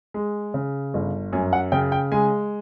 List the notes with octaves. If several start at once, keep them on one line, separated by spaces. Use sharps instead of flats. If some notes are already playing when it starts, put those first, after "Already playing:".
G#3
C#3
G1
F#2 G#5
F#5
C#3 G5
G5
G#3 G#5